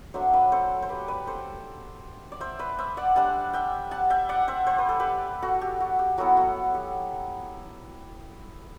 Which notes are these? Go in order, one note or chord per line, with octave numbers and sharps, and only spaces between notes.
F#3 A3 D4 C5 E5
B4 D5
A4 C5
C5
G4 B4
B4 D5
A4 C5
D5
C5 E5
B4 D5
C5 E5
D5 F#5
G3 D4 F#5 A5
E5 G5
F#5 A5
E5 G5
D5 F#5
C5 E5
C5
B4
A4
G4 B4
F#4 A4
G4
F#4
G4
F#3 B3 E4 F#4 A4
F#4 A4
G4